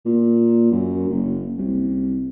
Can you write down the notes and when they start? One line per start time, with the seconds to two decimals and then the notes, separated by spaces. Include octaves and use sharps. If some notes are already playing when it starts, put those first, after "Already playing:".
0.06 A#2
0.71 F#2
1.09 F#1
1.58 C2